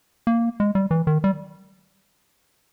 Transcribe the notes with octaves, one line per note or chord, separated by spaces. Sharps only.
A#3
G#3
G3
E3
D#3
G3